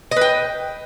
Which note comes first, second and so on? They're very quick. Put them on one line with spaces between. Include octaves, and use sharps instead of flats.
D#5 B4 G5